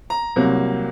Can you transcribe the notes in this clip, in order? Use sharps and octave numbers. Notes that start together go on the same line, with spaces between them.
A#5
C2 C3 F#3 A#3